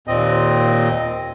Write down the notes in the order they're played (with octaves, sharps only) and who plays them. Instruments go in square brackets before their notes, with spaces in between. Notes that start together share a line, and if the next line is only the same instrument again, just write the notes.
[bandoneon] D#2 A#2 C4 D#5